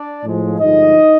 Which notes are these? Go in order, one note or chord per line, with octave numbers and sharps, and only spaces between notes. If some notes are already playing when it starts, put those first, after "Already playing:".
Already playing: D4 D5
A2 F3 G#3
G2 D3 F3 G#3 D#4 D#5